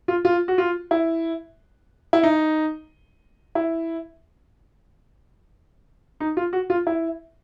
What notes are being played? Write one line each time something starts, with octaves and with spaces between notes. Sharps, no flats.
F4
F4
F#4
F4
E4
E4
D#4
E4
D#4
F4
F#4
F4
E4